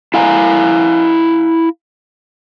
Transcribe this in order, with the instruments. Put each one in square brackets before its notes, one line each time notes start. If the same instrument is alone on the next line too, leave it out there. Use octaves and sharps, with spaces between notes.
[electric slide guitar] E4 F5 G#5 A#5